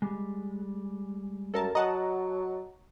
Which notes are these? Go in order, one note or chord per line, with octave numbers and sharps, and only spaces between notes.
G3 G#3
F#2 A4 A#4 A5
F#3 D#5 F#5 A5 A#5